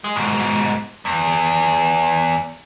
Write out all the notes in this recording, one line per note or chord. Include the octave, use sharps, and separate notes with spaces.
G#3
G#2 B2
E2